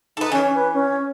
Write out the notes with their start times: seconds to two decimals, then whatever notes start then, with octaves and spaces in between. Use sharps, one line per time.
0.17 D#4 A4 B4
0.32 E3 C#4
0.54 B4
0.73 C#4